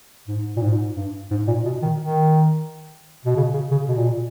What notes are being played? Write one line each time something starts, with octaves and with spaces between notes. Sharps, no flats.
G#2
A#2
G#2
G2
G#2
A#2
B2
D#3
D#3
B2
C#3
C#3
C#3
B2
A#2